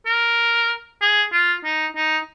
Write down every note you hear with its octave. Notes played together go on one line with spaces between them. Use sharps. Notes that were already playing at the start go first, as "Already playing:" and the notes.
A#4
G#4
F4
D#4
D#4